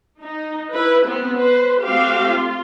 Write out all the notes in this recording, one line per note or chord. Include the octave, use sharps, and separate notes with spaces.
D#4
E4 B4
B3 C4
B4 C5
A3 C4 F#4 G4 F5
F4